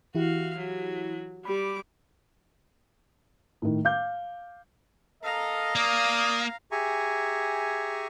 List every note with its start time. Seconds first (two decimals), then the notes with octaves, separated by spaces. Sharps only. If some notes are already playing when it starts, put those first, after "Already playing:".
0.15 E3 E4 F#4 G4 F5
0.56 F#3
1.45 G3 G4 B5 D6
3.62 A2 D#3
3.85 F5 D6 G6
5.23 A4 A#4 D#5 F5 A#5
5.76 A#3 D5 D#6
6.72 G4 G#4 E5 G#5 A#5 C#6